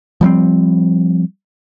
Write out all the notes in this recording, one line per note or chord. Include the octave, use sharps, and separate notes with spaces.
F3 G3 A#3 C4